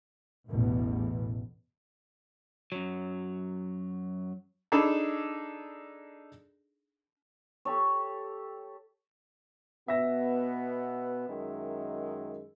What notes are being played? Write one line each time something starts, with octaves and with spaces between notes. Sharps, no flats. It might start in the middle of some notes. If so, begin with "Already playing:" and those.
A1 E2 B2
F#2 F#3
D4 D#4 G#4 A4 B5
G4 A4 C#5
B2 B3 E5 A#6
F#2 D#3 G#3